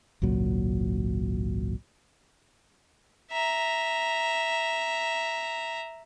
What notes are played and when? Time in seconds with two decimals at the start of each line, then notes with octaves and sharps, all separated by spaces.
0.22 G#1 C#2 A#2 F#3
3.32 E5 A#5